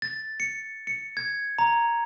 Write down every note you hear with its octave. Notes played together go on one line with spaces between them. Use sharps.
A6
C#7
C#7
G#6
A#5